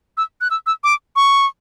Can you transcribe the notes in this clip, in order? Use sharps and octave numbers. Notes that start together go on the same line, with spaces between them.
E6
F#6
E6
E6
D6
C#6